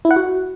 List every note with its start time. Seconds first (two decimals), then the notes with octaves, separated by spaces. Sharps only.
0.05 E4
0.11 F#5
0.16 F#4